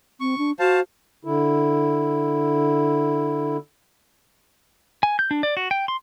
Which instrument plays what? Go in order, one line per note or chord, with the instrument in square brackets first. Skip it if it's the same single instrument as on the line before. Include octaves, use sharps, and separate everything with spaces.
[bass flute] C4 [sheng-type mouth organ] C#6
[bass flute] D4
[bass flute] F#4 [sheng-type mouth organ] C5 F5 A5
[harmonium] D3 E4
[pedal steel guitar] G#5
G6
D4
D5
F#4
G5
C6